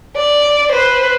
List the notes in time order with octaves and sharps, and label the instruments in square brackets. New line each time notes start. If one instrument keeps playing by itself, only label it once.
[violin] D5
B4 C5